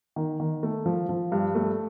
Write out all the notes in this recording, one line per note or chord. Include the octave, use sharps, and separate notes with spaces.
D#3
D#3
A3
F3
F3
G2
A3